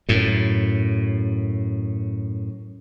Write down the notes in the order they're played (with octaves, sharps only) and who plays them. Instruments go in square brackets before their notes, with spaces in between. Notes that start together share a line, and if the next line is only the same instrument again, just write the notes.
[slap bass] F#2 A2